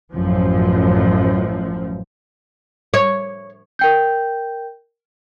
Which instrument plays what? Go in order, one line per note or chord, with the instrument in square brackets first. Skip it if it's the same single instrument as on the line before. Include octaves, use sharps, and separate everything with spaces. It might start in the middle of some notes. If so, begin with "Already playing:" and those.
[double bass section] A1 F#2 F3
[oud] C#5
[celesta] A#4 G5 G6